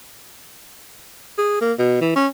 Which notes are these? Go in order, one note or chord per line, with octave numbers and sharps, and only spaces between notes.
G#4
A#3
B2
E3
C#4